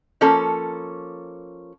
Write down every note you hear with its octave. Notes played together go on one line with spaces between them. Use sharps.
F3 A#3 C#4 A4